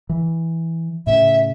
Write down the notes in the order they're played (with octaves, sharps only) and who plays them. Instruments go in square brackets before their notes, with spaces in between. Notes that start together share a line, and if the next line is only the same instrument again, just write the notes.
[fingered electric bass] E3
[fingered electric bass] A2 C#3 [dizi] E5